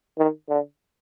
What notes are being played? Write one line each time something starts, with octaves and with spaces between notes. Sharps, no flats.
D#3
D3